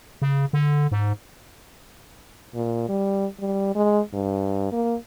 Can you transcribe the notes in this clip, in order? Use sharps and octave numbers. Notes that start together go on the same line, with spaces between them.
C#3
D3
G#2
A#2
G3
G3
G#3
G2
A#3